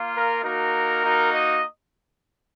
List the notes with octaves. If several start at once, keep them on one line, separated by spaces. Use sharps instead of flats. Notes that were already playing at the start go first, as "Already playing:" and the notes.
Already playing: A#3 F4
A#4
A#3 D#4 F#4 A#4
A#3 D#4 F#4
D#5